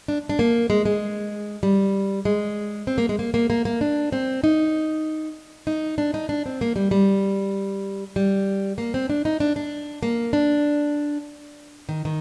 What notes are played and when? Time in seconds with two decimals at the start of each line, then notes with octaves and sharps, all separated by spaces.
0.08 D4
0.29 D4
0.39 A#3
0.70 G#3
0.85 G#3
1.63 G3
2.25 G#3
2.87 C4
2.98 A#3
3.09 G#3
3.19 A#3
3.34 A#3
3.50 A#3
3.65 A#3
3.81 D4
4.12 C4
4.44 D#4
5.67 D#4
5.98 D4
6.14 D#4
6.29 D4
6.46 C4
6.61 A#3
6.76 G3
6.91 G3
8.16 G3
8.78 A#3
8.94 C4
9.10 D4
9.25 D#4
9.40 D4
9.56 D4
10.03 A#3
10.33 D4
11.89 D#3
12.05 D#3